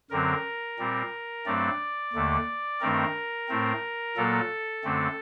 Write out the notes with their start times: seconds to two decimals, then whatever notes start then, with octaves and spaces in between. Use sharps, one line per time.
0.11 F#2 D3 F#3 C4 A#4
0.79 A#2 G3 C4
1.46 G2 F#3 A3 C4 D5
2.13 D#2 D3 A3
2.81 G2 D#3 A3 C4 A#4
3.49 A2 A3 C4
4.16 A#2 F#3 A#3 A4
4.84 F#2 D3 A3 C4